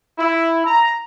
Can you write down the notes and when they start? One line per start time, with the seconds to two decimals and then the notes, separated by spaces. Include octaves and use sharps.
0.19 E4
0.66 A#5